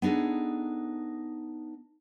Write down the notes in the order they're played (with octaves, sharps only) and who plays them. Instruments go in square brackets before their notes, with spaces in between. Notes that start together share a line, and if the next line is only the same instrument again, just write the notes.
[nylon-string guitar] B3 D4 D#4 G#4 A4